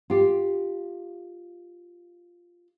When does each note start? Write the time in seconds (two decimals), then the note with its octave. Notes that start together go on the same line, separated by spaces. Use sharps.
0.10 F4 G4